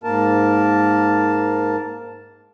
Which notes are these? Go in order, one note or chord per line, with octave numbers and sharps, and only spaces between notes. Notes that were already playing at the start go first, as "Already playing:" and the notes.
G#2 A#3 A#4 A5